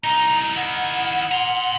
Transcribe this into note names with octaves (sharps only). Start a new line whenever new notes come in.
C2 D#4 A#5
D#3 E4 F#5
A#5 C6